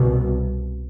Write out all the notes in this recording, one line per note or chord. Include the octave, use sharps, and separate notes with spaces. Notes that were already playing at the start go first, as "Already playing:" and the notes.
Already playing: C2 B2